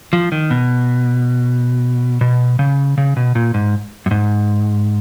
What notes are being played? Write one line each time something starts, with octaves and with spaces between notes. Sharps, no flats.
F3
D#3
B2
B2
C#3
C#3
B2
A#2
G#2
F#2
G#2